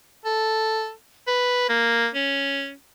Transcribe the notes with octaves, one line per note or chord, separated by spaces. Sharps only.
A4
B4
A#3
C#4